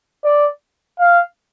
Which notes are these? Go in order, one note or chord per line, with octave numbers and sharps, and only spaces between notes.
D5
F5